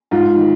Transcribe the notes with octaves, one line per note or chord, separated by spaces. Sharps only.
G#2 F4
D#3